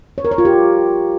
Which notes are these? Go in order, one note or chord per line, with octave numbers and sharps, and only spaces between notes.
C#5
A#4
C#5
F4
G4